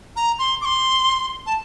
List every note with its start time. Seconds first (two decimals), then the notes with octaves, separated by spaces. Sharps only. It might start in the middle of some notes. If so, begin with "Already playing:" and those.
0.16 A#5
0.39 C6
0.61 D6
0.65 C6
1.46 A5